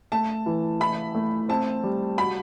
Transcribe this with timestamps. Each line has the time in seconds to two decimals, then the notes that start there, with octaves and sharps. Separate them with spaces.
0.12 A3 A5
0.46 E3
0.80 E4 B5
1.15 A3
1.49 C4 A5
1.83 G3
2.18 F#4 B5